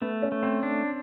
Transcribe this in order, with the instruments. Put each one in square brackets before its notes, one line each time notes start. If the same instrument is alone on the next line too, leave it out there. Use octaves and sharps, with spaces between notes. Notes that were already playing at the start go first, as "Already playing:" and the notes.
[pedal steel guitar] A3 [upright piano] B3
[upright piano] C#4
[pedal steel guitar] A3
[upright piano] C4
[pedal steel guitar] D4